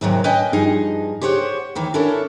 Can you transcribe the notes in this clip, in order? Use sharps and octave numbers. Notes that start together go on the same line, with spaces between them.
D#2 G#2 C3 D#3 F#3 C4
C#4 B4 D#5 G5 G#5
G2 F3 D#4 G#4
G4 G#4 C5 C#5 D#5 F#5
D#2 D#3 E3
C#4 D4 E4 A4 A#4 C#5